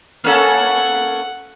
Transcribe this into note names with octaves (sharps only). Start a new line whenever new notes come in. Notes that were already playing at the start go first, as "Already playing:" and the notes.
A#3 C#4 A4 F#5